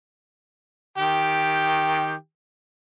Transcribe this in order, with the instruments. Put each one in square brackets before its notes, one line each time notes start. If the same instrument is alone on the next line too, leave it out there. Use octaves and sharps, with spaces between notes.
[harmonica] D#3 G4 G5